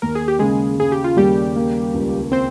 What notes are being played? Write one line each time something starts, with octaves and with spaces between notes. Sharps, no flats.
D#2 A#4
G#4
G4
C#3 G#3 G#4
C#3 G#4
G4
F4
D#2 G3 G4
A#3
C#2
C4 C5